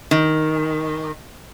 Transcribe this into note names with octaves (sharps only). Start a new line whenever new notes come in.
D#3